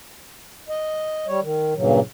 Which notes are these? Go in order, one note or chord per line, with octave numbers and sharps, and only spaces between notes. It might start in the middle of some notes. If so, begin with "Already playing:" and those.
D#5
G3 C#5
D#3
G2 A#2 C#3 F#3